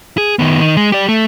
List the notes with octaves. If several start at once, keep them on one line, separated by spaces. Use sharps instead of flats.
G#4
D#3 B3
D#3
G#3
G4 D5
A3